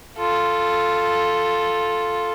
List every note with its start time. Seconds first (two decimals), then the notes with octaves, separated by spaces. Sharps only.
0.18 F4 A4